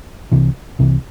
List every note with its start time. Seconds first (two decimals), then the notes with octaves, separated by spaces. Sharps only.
0.32 C2 C3 E3
0.79 C2 C3 E3